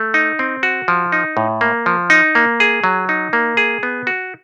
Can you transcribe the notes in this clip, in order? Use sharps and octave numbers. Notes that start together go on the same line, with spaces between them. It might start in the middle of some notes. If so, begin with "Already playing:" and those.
Already playing: A3
D#4
C4
F#4
F3
D#4
A2
A#3
F3
D#4
A#3
G#4
F#3
D#4
A#3
G#4
B3
F#4